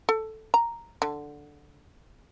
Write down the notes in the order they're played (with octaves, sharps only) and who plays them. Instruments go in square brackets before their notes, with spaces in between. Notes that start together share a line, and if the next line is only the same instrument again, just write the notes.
[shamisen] A4
A#5
D3